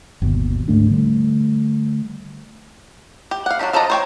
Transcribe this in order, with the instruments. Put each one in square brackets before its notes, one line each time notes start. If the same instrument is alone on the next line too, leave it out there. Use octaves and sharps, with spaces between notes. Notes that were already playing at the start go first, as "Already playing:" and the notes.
[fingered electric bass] G1 D#2 B2
D2 G#2 A3 D4
D3 G3 A3
[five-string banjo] G4
F5 F#5
F#3 D4 D#4 G4
F3 A4 D5 D#5 A#5
C5 C#5 G5